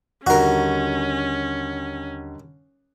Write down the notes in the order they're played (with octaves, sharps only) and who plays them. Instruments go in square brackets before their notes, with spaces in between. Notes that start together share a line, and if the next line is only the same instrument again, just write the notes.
[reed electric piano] D#2 F#5 [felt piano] D3 G3 D#4 [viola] C#4 [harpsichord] F#4 A#4